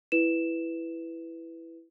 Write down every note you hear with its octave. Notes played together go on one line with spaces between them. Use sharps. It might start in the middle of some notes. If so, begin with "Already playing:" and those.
E4 B4 E7